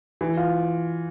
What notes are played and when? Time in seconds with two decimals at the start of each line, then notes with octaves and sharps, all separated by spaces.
0.21 E3
0.37 F4